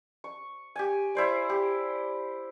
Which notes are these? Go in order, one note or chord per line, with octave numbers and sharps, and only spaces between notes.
C#6
G4 G#5
E4 C5 D5
G4